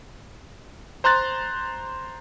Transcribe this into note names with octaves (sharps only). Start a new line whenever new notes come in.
C5 A#5 C6 F#6 A6